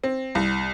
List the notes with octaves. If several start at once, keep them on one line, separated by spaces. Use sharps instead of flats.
C4
C2